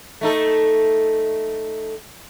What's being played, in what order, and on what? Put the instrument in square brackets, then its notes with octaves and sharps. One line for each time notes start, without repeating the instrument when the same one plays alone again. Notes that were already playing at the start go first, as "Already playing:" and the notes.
[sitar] A3 D#4 A4